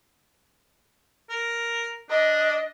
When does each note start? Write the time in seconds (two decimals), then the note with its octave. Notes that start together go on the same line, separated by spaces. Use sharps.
1.30 A#4
2.10 D4 D#5